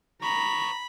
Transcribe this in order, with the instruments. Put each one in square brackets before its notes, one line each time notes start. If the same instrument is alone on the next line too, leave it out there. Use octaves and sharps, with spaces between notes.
[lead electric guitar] B4 C#5 [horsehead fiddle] A#5 [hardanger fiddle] B5